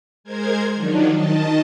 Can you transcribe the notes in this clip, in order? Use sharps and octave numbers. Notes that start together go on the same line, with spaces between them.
G#3 A#4 C5 G#6
D#3 F3 F#3 D4 D#4
D#3 D#5 A5